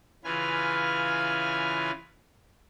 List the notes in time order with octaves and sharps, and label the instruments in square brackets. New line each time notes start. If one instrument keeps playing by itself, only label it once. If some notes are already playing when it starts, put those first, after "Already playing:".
[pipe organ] C#3 E3 F4 B4 G#5 F6